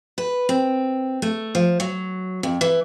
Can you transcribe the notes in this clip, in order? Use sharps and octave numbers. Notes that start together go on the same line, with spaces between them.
B4
C4
A3
F3
F#3
F2
E3